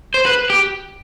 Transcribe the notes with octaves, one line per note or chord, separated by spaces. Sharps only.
C5
B4
G4